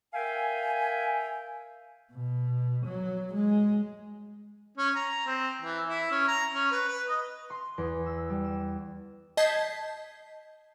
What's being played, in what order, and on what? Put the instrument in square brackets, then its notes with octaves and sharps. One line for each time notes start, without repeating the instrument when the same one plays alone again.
[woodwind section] A#4 E5 F5 G5 G#5
[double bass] B2
F#3
G#3
[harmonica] C#4
A#5
C4
E3
E4
C#4
A#5
C#4
B4
B4
D#5
[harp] C6
E2
E6
G3
E7
[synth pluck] D#5 A5 G6 G#6 B6 C7